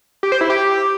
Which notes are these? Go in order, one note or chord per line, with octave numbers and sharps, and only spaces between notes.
G4
C5
E4
G4